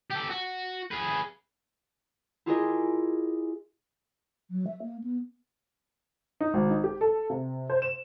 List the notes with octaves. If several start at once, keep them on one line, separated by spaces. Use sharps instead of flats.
G4 A4
F#4
G#4 B4
E4 F4 G4 G#4 A#4 D#5
F#3
E5
A#3
B3
D#4
G#1
D#4
G4
A4
C3
C5
E7